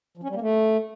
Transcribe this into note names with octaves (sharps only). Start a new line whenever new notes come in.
F3
C#4
G3
A#3
A3